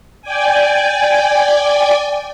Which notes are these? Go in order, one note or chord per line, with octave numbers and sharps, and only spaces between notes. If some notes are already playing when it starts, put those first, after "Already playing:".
D5 G5 G#5